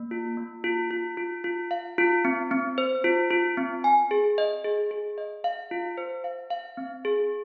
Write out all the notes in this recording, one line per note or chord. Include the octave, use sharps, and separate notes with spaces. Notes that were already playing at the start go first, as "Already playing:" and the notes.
Already playing: A#3
F4
A#3
F4
F4
F4
F4
F5
F4
C4
C4
C5
F4
F4
C4
G#5
G#4
D#5
G#4
G#4
D#5
F5
F4
C5
F5
F5
C4
G#4